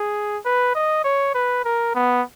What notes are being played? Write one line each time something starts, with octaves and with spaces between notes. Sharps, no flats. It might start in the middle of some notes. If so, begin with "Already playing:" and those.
Already playing: G#4
B4
D#5
C#5
B4
A#4
B3